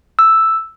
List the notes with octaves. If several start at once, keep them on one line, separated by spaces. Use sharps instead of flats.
E6